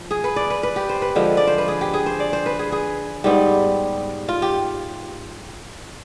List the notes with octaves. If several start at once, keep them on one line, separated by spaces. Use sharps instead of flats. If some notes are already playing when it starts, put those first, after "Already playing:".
Already playing: F3
G#4
B4
D5
B4
B4
G4
C5
B4
D3 F3 G#3
D5
C5
B4
G#4
G4
G#4
C5
D5
C5
B4
G#4
G#4
G#2 G3 B3 G4
F4
G4